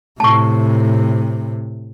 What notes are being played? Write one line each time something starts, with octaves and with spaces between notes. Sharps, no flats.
A2 C3 A5 C#6